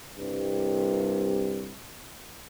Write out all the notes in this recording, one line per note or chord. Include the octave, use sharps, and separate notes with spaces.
C2 G2 C3